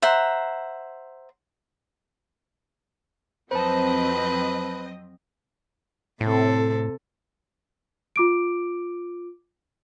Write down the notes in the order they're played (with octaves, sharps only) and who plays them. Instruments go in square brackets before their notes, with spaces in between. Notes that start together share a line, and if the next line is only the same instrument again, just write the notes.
[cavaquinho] C5 E5 F#5 A#5
[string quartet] F2 [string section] F#3 C4 D#5 [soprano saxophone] B4 [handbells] C5 A5
[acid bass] A2 [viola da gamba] C3 C4 A4
[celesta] F4 D6 D7